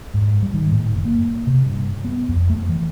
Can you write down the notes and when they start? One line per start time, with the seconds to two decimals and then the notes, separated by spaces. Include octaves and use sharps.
0.14 G#2
0.42 G3
0.54 D#3
0.72 A2
0.92 F#1
1.05 A#3
1.47 C3
1.66 G2
2.04 B3
2.28 F2
2.50 A3
2.69 E3